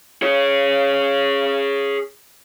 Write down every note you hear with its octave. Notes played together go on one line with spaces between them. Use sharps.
G#4 C#5